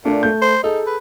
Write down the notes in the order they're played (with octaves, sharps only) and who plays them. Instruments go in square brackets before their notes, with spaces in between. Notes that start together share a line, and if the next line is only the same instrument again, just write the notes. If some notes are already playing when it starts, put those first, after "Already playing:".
[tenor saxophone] A#2 [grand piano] A3 D4
[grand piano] A3 G6
[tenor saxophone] C5
[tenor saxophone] D#4 [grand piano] G#4 A4
[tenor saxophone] B4